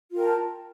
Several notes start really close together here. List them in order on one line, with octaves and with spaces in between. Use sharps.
F4 A#4 G5 A5